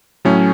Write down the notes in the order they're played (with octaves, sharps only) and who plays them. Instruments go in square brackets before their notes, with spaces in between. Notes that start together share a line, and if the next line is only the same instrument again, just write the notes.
[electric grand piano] A2 F#3 A3 C#4